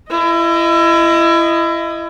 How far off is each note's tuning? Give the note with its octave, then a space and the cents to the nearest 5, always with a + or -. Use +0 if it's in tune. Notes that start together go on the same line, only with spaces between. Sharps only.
E4 +30 D#5 +0